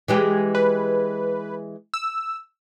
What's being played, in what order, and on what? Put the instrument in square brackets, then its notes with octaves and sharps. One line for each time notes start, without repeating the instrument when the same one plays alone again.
[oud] E3 G#3 G4
[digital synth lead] B4
E6